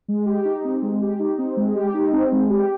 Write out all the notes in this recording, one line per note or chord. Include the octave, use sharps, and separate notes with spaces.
G#3
G4
D#4
C4
G#3
G4
D#4
C4
G#3
G4
D#4
C4
G#3
G4